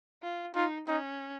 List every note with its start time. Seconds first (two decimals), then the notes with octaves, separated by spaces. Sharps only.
0.22 F4
0.55 D#4 F4
0.88 C#4 D#4